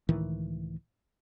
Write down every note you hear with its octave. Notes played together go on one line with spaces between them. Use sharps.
C#2 A2 D#3 E3